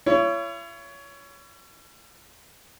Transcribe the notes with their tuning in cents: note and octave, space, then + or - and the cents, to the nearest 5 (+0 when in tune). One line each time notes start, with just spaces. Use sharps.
E4 +45 C#5 +20